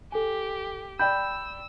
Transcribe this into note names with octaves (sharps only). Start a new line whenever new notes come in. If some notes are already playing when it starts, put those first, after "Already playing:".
G4 A4 G#5
D5 G5 B5 E6 G6